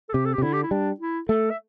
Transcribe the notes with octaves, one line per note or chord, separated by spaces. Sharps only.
A4
C3 G4
A4
G4
C3
D3 E4
G4
E4
G3 D4
E4
A3 A4
E5